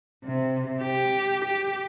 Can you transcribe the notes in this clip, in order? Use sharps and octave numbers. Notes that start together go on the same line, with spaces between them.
C3
G4
G4